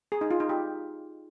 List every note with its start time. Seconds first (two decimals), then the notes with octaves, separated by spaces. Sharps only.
0.12 G#4
0.21 D#4
0.31 F4
0.40 D#4
0.49 G4